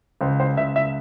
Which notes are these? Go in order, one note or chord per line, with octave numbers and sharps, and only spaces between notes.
C#2 C5
C5
C#2 E5
E5